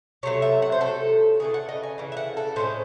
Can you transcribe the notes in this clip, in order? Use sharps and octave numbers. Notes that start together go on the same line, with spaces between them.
C3 F#3 A3 C#5
E5
F#5
C5
C3 F#3 A3 A4
C#3 E3 A3 G#4
F#5
D#5
G#5
C#3 E3 A3
E5
F#5
A4
A2 G#3 C#4 C5